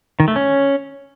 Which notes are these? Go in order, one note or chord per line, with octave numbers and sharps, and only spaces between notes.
D#3
A3
C#4